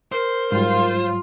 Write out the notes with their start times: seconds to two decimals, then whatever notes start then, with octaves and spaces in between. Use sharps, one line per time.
0.12 A#4 C5
0.52 G#2 F#3 G3 F4